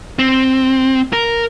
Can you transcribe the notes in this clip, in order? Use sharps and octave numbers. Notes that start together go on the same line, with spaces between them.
C4
A#4